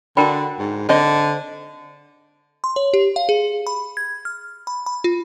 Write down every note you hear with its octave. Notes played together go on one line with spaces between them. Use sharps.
D3 D4 F#4 A#4 G5 B5
G#2
D3 C4 C5 D#5
C6
C#5
G4
F5
G#4
B5
G#6
F6
B5
B5
F4